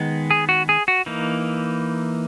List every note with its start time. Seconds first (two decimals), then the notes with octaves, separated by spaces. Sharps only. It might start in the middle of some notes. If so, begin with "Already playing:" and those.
Already playing: D#3 G#3 B3
0.31 G#4
0.49 F#4
0.69 G#4
0.88 F#4
1.06 E3 A#3 D#4